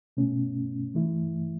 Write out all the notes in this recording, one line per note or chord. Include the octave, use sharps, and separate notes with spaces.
B2 A3 C#4
E3 A3 E4